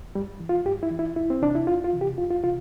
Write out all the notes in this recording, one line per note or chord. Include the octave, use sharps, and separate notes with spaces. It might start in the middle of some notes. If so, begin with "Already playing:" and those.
G2 G3
E3
F4
G2 G4
E4
E3
E4
E2 E4
C4
C3 E3 D4
E4
E2 F4
F4
C3 E3
G4
F2 F4
F4
C3 E3 F4